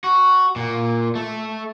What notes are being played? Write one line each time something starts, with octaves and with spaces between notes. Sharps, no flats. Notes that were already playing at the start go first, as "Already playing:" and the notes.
F#4
A#2
A3